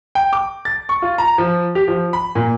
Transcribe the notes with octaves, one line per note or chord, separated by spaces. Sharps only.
G5
D6
A6
C#6
F4
A#5
F3
G4
F3
B5
A#2